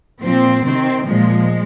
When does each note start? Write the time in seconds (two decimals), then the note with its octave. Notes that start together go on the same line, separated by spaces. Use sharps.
0.22 A#2 F3 C4
0.65 C3 D#3 C4
1.07 A#2 F3 G#3